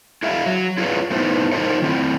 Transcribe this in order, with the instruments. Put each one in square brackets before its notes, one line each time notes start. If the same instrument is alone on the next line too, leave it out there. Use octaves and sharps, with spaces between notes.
[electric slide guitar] E4 F#4 G#4 E5 F5
F#3
E4 F4 G#4 B4 C#5 D5
A3 B3 D#4 E4 C5
D#4 F4 A4 A#4 C5 C#5
D#3 C4 E4